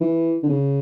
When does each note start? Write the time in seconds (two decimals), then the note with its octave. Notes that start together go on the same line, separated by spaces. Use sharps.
0.01 E3
0.43 D3
0.49 C#3